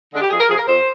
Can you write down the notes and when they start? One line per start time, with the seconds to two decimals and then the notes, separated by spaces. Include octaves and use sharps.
0.12 D3 G#3 D4
0.22 G4
0.30 F2 G#4
0.40 A#4
0.49 C3 F3 G#4
0.57 A#4
0.67 F2 C5